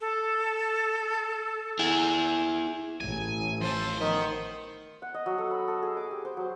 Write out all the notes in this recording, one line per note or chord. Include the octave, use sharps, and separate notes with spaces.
A4
E4 G#4
A1 G#5
F3 A4 C5
D#3 B3
F#5
D#5
F#3
A4
B5
A4
G#4
D6
G4
C5
F#3